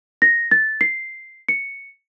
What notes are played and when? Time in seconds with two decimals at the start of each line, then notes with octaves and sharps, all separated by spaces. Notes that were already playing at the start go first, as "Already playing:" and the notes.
0.22 A#6
0.51 A6
0.81 C7
1.49 C#7